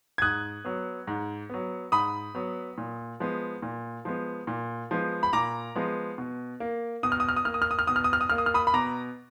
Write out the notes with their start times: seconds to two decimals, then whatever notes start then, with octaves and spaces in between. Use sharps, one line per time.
0.18 G#6
0.22 G#2 D#6 F#6
0.65 F#3 B3
1.07 G#2
1.50 F#3 B3
1.92 G#2 B5 D#6
2.35 F#3 B3
2.78 A#2
3.20 F3 G#3 B3
3.62 A#2
4.05 F3 G#3 B3
4.47 A#2
4.91 F3 G#3 B3
5.23 B5
5.33 A#2 A#5 D6
5.75 F3 G#3 B3
6.18 B2
6.60 A#3
7.03 B2 D#6
7.12 F6
7.20 D#6
7.29 F6
7.37 D#6
7.45 A#3 F6
7.54 D#6
7.62 F6
7.71 D#6
7.79 F6
7.87 B2 D#6
7.96 F6
8.04 D#6
8.13 F6
8.21 D#6
8.29 A#3 F6
8.38 D#6
8.46 F6
8.54 B5 D#6
8.67 B5
8.74 B2 A#5 D6